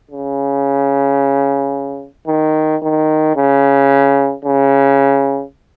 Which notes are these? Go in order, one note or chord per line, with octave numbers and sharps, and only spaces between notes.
C#3
D#3
D#3
C#3
C#3